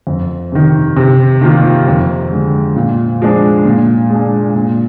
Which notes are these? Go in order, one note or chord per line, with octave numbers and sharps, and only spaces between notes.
F2
C3 D#3
C3
D#3 A#3 F4
F2
D3 G#3
A#2
F3 G#3 D4
A#2
G#3 D4
A#2